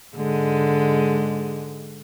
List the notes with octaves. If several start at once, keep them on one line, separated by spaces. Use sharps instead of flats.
G#2 D3 G#3